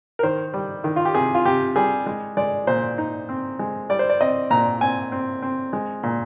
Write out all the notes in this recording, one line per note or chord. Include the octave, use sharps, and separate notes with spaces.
A#4
D#3 C5
G3
D#3
F4
G4
C3 G#4
F4
C3 G4
G3 G#4
G#3
G#3 D5
A#2 C5
D#4
C4
G#3
G3 D5
C5
D5
C4 D#5
A#2 A#5
C4 G#5
C4
C4
G#3
A#2